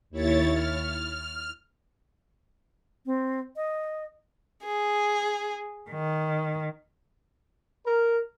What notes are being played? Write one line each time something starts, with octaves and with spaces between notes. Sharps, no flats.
D#2 E4 C#5 A6
F6
C4
D#5
G#4
D#3
A#4